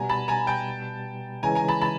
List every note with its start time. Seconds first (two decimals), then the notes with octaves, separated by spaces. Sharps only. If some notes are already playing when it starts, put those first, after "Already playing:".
Already playing: B2 G3 B3 G#5 A#5
0.09 A5 B5
0.28 G#5 A#5
0.47 G5 A5
1.43 C#3 E3 G#3 C#4 G#5 A#5
1.55 G#5 A#5
1.68 A5 B5
1.81 A5 B5